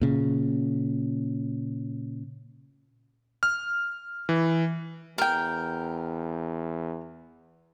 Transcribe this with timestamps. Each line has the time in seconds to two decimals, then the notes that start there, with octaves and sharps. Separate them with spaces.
0.01 A#2 C#3
3.43 F6
4.29 E3
5.18 E2 A#4 G5